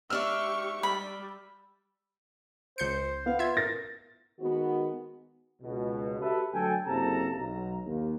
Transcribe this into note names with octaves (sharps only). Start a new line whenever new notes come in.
G#2 D4 G4 E5 C#6 E6 F6
G3 B5
C#2 C5 G6 C#7
B3 F5
F4 E5 G#6
A#4 A6 A#6
D#3 G#3 B3 F#4
C#2 B2
F#4 G4 A4 B4 E5
D2 F#3 A4 G5 G#5
F#1 C3 A4 A5 A#5
B1 A#5
D#2